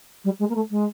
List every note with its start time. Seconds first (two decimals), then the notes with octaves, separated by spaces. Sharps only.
0.25 G3
0.40 G#3
0.49 A#3
0.55 A3
0.71 G#3